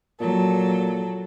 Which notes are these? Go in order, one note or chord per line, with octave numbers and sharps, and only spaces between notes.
A#2 F#3 A4